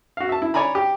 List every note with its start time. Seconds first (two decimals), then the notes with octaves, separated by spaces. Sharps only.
0.17 F#4 F5
0.29 E5 A5
0.42 E4
0.54 C#5 D5 G#5 A#5 B5
0.75 G4